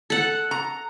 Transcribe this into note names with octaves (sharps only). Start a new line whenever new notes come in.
A4 F#5
A#5